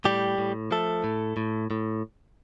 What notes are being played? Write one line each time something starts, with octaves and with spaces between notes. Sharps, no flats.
A2 G3 G4
A2
F3 A3 A4
A2
A2
A2